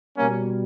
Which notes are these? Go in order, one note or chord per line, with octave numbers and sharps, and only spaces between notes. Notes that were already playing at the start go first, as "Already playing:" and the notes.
B2 G3 A#3 C#4